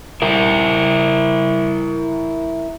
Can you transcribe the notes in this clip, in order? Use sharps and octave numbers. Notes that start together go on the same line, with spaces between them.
E4 A#4